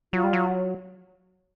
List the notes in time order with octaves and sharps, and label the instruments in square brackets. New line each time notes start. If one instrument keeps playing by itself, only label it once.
[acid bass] F#3 [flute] F4
[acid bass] G3
F#3